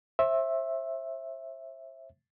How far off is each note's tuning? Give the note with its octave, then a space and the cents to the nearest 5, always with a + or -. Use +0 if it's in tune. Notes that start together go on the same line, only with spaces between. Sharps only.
C5 +35 E5 +0